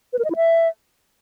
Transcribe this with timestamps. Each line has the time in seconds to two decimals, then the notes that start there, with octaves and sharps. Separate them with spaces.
0.13 B4
0.19 A#4
0.25 D#5
0.30 E4
0.36 E5